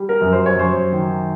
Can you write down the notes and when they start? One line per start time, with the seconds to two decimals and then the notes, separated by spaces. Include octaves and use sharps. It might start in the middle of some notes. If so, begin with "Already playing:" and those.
Already playing: G3
0.09 A#4
0.21 F#2
0.33 C5
0.46 C#5
0.56 F#2 C5
0.92 D#3